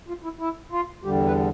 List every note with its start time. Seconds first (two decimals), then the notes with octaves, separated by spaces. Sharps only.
0.08 F4
0.24 E4
0.39 E4
0.71 F4
1.04 E2 D3 G3 G4
1.26 B4